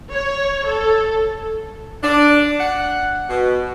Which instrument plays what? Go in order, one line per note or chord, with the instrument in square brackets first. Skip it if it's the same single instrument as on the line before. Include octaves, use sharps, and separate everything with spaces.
[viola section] C#5
A4
[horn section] D4
F#5
B2